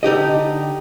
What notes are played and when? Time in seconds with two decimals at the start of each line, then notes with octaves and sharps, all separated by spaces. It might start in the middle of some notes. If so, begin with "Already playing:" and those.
0.03 D3 D#4 G4 D#5